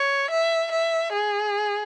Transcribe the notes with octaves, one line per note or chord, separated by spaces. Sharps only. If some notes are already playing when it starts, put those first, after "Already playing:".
Already playing: C#5
E5
E5
G#4